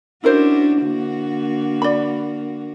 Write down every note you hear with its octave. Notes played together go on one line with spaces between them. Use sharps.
C#4 D4 E4 F#4 A#4 C5
D3 A#3 F#4
D5 B5